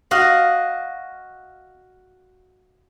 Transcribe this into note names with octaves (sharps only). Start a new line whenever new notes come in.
F#4 D#5 F5